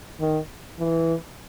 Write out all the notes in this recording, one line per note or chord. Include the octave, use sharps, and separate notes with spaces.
D#3
E3